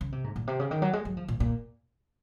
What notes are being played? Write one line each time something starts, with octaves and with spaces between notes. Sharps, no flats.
C#3
C3
G#2
A#2
C3
C#3
D#3
F#3
G#3
F#3
F3
A#2
A#2